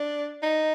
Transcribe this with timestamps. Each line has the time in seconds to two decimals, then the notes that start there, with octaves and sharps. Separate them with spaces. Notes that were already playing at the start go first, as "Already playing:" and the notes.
Already playing: D4
0.43 D#4